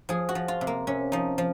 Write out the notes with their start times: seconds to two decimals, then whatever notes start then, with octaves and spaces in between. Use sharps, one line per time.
0.09 F3 G#4
0.29 F#4
0.35 F3
0.48 F4
0.61 C3
0.67 A#3
0.87 C3 C#4
1.12 F3 D#4
1.38 F3